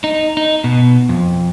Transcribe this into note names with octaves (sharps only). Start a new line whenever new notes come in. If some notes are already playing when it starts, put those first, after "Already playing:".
D#4
D#4
B2
F2